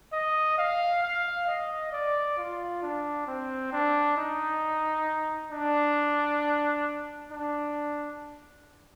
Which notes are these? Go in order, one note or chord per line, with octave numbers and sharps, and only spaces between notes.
D#5
F5
F5
D#5
D5
F4
D4
C4
D4
D#4
D4
D4